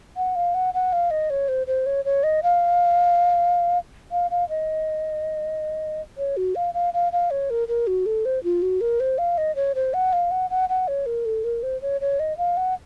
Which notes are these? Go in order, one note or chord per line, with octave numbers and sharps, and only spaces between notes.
F#5
F5
F#5
F#5
F5
D#5
C#5
C5
C5
C#5
C#5
D#5
F5
F5
F5
D#5
C#5
F#4
F5
F5
F5
F5
C#5
A#4
A#4
F#4
A4
C5
F4
F#4
A#4
C5
F5
D#5
C#5
C5
F#5
F5
F#5
F#5
F#5
C#5
A#4
A4
A#4
C5
C#5
C#5
D#5
F5
F#5